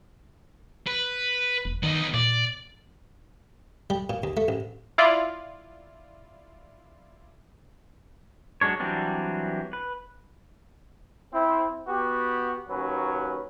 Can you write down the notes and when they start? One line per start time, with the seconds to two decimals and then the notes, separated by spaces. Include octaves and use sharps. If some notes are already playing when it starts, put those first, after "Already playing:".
0.87 B4
1.65 E1
1.83 D#3 B3 D#4
2.14 A#2 D5
3.90 G3
4.10 A#2
4.23 D#2
4.37 A3
4.48 A1
4.98 E4 F4 D5
8.61 F#3 G#3 D4 C#5
8.80 E3 F#3 G3 C4 D4
9.73 B4
11.34 C4 E4
11.88 B3 F#4 G4
12.69 D#2 F#3 C#4 B4